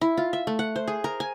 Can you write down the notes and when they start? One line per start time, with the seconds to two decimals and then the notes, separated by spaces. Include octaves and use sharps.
0.01 E4
0.17 F4
0.33 E5
0.47 A3
0.59 F#5
0.76 C5
0.88 G#4
1.04 A#4
1.20 G#5